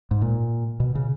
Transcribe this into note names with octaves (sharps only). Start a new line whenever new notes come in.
G#2
A#2
B2
C#3